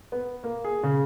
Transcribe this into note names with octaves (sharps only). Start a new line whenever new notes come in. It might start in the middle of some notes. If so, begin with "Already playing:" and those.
B3
A#3
G#4
C#3